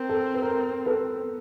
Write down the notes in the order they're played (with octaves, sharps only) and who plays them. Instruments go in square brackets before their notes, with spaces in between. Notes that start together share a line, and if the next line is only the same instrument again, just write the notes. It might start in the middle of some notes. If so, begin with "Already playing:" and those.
Already playing: [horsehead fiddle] C4 [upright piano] A#4
[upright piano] A4
B4
A#4
A4 B4
[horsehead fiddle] B3